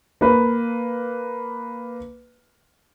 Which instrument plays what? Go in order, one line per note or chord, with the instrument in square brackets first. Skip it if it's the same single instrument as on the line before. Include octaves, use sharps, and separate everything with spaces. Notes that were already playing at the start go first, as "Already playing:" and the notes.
[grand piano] A#3 B4